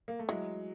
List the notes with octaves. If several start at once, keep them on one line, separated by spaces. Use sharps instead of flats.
A#3
A3
E3 F#3 G#3